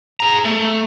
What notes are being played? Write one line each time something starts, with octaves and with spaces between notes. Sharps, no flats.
G#4 A#5
A3